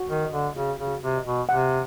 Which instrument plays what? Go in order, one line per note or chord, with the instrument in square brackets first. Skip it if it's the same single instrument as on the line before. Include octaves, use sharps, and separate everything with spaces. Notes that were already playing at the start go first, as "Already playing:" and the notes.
Already playing: [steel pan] F#4
[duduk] D#3
[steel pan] D#5
[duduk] D3
[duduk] C#3 [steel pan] F#4
[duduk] C#3
[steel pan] F#4
[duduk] C3
[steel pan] D#5
[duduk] B2
[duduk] C3 [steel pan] F#5